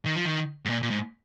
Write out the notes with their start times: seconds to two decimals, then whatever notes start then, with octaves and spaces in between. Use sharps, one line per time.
0.06 D#3
0.16 F3
0.25 D#3
0.65 G#2
0.70 A#2
0.83 A#2
0.91 G#2